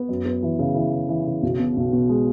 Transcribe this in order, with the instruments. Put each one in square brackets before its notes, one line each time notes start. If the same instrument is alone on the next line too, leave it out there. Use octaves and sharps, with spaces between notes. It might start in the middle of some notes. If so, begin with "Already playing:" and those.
Already playing: [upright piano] B3
F#2
B3
E3
C#3
E3
E3
E3
C#3
B1
B2
B1
B2
G#3